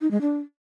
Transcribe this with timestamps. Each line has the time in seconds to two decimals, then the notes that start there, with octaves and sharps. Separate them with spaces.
0.01 D#4
0.11 G#3
0.21 D4